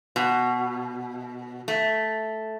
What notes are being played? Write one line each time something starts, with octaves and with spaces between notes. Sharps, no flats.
B2
A3